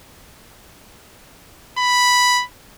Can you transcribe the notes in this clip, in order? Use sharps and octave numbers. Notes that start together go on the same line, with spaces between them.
B5